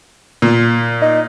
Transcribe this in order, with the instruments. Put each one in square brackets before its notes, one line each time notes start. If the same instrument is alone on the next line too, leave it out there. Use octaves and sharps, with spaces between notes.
[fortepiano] A#2
[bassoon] D#4